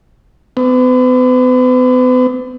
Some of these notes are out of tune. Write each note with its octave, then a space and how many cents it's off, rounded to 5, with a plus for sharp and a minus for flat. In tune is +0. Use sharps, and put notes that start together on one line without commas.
B3 +40